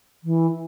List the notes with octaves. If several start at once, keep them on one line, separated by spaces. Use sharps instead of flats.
E3